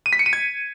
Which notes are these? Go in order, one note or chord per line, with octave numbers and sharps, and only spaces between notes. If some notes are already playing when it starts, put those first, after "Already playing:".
D#7
B6
C#7
D#7
G#6